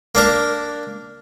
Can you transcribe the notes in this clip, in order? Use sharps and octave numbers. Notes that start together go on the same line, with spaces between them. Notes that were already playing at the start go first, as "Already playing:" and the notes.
A#3 D4 A#4